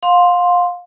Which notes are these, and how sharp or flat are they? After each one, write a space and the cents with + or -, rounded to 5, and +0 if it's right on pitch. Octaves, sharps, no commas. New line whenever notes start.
F5 +30 C6 +0